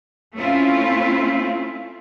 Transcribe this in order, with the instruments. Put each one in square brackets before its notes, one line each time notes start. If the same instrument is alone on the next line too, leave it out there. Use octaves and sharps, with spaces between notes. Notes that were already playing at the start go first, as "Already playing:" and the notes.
[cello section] A3 C4 C#4 E4 F4